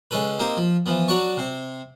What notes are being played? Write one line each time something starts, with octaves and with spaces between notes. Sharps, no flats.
C#2 G#3 C#4 A4 B4
A#3 C4 D#4 G4
F3
E3 F3 B3
F#3 D4 F#4 D5 A5 C#6
C3 C4